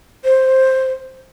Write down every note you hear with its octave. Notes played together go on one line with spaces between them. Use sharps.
C5